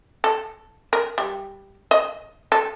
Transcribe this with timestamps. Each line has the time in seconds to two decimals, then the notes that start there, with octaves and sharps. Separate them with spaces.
0.24 A4
0.93 A#4
1.18 G3
1.91 D#5
2.52 A4